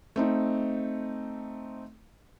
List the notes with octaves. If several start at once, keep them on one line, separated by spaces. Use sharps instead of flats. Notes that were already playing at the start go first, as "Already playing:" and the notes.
A3 C4 D#4